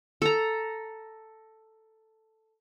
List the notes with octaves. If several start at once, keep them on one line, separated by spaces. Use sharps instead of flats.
A4 A#5